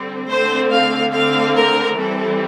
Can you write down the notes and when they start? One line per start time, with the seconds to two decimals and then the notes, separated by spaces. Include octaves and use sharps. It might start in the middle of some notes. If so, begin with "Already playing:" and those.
Already playing: D3 G3 C4
0.29 D3 A3 C4 C5
0.71 F5
1.14 D3 A3 C4 F5
1.56 A#4
1.98 E3 G3 C4 A4